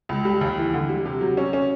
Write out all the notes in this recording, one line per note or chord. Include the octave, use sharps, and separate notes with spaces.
C#2
G3
D#2
E3
D3
G3
C3
F#3
C#4
C#4